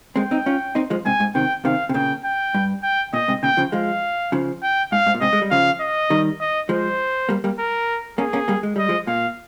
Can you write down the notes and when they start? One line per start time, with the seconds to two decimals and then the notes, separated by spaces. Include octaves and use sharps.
0.16 G#3 C4 G5
0.31 C4 D#4
0.46 C#4 F4
0.75 C4 D#4
0.90 F3 G#3
1.05 G#2 C3 G#5
1.20 G#2
1.35 C3 D#3 G5
1.65 C3 D#3 F5
1.89 C3
1.94 A#2 C#3 G5
2.24 G5
2.54 G2
2.83 G5
3.13 A#2 D#5
3.28 G#2 C3
3.43 A#2 C#3 G5
3.57 C#3 F3
3.72 F3 G#3 F5
4.32 C#3 F3
4.62 G5
4.92 G#2 F5
5.07 G#2
5.15 A#2
5.21 G#2 C3 D#5
5.33 G#3
5.42 G3
5.51 C#3 F3 F5
5.80 D#5
6.10 D#3 G3
6.40 D#5
6.69 F3 G#3 C5
7.29 G3 A#3
7.44 G3 A#3
7.59 A#4
8.18 A#3 C#4 G#4
8.33 A#3 C#4
8.48 G3 A#3
8.63 G#3
8.76 G3 D#5
8.89 F3 G#3
9.07 A#2 F5